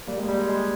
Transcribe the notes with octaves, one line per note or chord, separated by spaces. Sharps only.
G3 A#3
G#3
G3
G#3
G#3